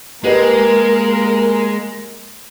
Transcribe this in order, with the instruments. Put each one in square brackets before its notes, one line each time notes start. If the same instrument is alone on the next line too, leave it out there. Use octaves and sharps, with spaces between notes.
[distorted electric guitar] G#3 [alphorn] A#3 [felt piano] G4 B4 D#5 [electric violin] A#4